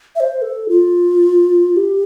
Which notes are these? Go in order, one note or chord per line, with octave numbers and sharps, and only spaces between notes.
E5
C5
A4
F4
G4